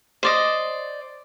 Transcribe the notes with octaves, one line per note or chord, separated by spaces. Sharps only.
C5 D5 D#5